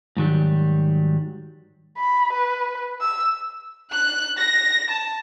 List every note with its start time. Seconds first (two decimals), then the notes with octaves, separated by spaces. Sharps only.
0.17 G#2 D#3 F#3 G3
1.98 B5
2.33 B4
3.01 E6
3.93 F#6
4.39 A#6
4.90 A5